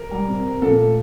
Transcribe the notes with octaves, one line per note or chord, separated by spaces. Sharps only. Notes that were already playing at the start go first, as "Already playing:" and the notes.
Already playing: A#4
G3
C3
C3
A#2 A4
A3